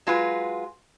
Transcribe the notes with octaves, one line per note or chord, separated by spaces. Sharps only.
F#3 G#3 F4 F#4 B4